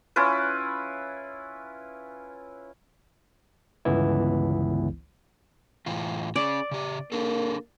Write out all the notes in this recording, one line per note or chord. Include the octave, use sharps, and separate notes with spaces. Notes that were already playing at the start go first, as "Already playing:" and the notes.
C#4 E4 F4 B4
G1 C#2 E3 B3 E4
A2 E3 F4
C#4 G#4 D5
C#3 G4
A#3 D4 G#4 A4